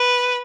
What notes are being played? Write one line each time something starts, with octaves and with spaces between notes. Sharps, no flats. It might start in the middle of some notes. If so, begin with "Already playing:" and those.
Already playing: B4